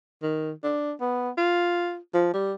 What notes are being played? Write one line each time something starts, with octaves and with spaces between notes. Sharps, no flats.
D#3
D4
B3
F4
F3
G3